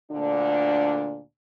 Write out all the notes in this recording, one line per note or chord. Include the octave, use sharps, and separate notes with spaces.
D2 A#2 D3 D4